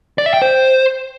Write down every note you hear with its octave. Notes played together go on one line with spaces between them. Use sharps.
D5
E5
G5
C5